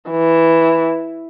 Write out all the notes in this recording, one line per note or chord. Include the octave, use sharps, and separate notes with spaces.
E3